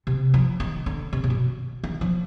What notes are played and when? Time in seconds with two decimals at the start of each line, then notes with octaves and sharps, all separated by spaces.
0.07 C3
0.34 F3
0.60 D#3
0.86 D3
1.13 C3
1.24 C3
1.30 B2
1.84 D#3
2.01 F3